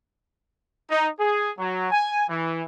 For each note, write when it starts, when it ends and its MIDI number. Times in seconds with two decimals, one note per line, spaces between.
0.91 1.08 63
1.20 1.51 68
1.58 1.87 54
1.91 2.24 80
2.29 2.63 52